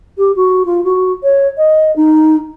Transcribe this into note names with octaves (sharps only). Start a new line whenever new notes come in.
G4
F#4
F4
F#4
C#5
D#5
D#4